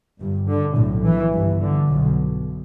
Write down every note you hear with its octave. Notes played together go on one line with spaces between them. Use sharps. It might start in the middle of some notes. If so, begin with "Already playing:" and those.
G1 G2
D3
B1 A2
E3
G1 G2
D3
B1 B2